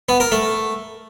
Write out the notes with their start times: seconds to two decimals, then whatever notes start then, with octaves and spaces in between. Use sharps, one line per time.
0.09 B3
0.20 A#4
0.32 A3